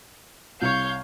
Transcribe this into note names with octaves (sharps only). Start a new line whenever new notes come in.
C2 C#5 F5 G6